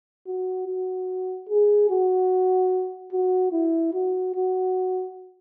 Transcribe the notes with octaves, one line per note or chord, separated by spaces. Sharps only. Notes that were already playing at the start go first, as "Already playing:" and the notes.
F#4
F#4
G#4
F#4
F#4
E4
F#4
F#4